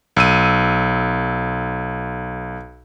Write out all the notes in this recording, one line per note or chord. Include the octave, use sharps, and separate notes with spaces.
B1 E6 D#7